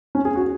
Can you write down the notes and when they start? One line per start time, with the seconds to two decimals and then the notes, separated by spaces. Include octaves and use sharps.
0.15 C#4
0.25 G#4
0.35 F#4